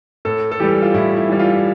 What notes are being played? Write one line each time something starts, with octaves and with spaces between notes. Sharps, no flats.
A2 A4
A4
E3 G3 G4
F4
A2 E4
E4
E3 G3
F4